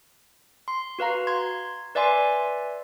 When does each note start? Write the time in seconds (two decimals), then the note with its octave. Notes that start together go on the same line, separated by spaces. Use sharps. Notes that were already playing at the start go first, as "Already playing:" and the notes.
0.68 C6
0.99 F#4 B4 F5 A#5
1.27 C6 G#6
1.95 B4 D5 E5 G#5 C6